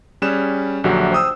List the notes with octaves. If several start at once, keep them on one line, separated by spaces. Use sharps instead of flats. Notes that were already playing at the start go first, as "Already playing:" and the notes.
G3 C#4 G#4 F#6 E7
A#1 D3 F#3 F#4 G4 E5
C5 G5 D#6 E6